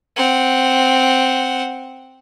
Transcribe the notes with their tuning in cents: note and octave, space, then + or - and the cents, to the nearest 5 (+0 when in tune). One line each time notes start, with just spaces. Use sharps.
C4 +0 F#5 +0